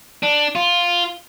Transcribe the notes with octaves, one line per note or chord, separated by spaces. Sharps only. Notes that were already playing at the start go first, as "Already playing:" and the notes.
D4
F4